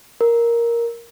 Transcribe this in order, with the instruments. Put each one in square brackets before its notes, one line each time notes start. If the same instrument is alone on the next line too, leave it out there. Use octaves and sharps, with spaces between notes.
[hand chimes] A#4